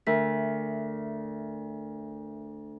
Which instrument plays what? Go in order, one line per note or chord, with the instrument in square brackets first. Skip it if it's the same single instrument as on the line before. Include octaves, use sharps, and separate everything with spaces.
[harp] D2 [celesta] A#4 E5 B6